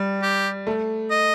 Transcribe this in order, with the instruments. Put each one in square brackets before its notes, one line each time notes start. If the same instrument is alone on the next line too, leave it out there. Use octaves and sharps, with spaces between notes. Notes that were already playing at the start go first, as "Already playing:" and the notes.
Already playing: [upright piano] G3
[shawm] G4
[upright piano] A3
[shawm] D#5